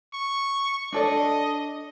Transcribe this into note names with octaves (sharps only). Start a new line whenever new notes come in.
C#6
D4 A4 D5 D#5